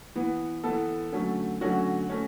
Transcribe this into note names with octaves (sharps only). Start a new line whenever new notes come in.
E3 B3
E3 B3 A4
D3 F#3 A3 C#4
D3 F#3 A3 C#4 F#4
A3 C#4